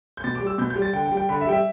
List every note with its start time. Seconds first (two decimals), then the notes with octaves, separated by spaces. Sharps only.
0.17 G6
0.24 B2 A6
0.35 D6
0.40 G3
0.47 E6
0.58 B2 G6
0.70 G6
0.76 G3
0.82 A6
0.93 D3 G5
1.06 G5
1.12 G3
1.17 G5
1.29 D3 B5
1.41 E5
1.47 G3 G5
1.52 E5